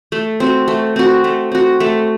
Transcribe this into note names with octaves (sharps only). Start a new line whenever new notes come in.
A3
C4 F#4
A3
C4 F#4
A3
C4 F#4
A3